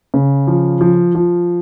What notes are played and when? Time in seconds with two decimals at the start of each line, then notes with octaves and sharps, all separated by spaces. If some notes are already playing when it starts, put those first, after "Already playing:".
0.14 C#3
0.47 F3
0.81 F3
1.15 F3